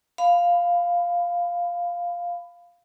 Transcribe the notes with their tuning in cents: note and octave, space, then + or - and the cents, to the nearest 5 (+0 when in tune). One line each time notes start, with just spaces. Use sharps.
F5 +0 B5 +20